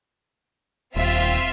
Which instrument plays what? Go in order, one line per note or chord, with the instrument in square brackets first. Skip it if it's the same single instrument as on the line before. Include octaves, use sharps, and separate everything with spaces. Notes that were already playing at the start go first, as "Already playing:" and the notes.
[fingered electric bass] D#1 [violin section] C4 F4 E5